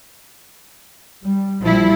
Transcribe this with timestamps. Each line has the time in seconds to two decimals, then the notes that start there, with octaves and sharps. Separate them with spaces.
1.24 G3
1.62 A#1 F3 G3 E4